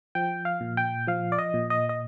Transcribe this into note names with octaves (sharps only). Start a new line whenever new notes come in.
F3 G5
F5
A#2
G5
F3 F5
D5
D#5
A#2
D#5
D#5